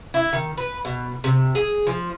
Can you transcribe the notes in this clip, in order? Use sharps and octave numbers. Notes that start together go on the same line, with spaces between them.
E4
D#3
B4
B2
C3
G#4
F3